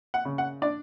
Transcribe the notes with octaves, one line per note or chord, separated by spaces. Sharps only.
F#5
C#3
F#5
D4 D5